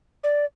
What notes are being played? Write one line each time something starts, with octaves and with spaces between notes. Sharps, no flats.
D5